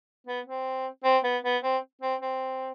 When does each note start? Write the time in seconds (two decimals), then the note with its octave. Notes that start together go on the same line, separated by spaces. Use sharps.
0.27 B3
0.46 C4
1.04 C4
1.24 B3
1.44 B3
1.64 C4
2.02 C4
2.21 C4